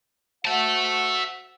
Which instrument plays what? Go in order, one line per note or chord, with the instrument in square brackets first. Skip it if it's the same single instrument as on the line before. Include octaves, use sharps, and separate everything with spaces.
[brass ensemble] F#4 C5 F#5 [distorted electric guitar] E5 A5